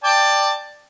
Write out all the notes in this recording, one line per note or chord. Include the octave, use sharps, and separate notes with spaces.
D5 G5 A5